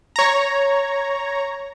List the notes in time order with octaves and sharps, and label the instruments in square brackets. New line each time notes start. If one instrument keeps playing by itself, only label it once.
[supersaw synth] C#5 A#5